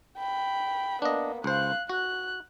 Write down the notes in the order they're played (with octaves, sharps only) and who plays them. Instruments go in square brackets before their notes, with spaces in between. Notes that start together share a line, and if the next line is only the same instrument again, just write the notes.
[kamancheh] G5 B5
[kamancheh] A#3 B3 [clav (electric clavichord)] D4 D#5
[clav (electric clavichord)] C#2 C5 [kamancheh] F5 F#6
[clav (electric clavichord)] F#4 [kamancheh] F#6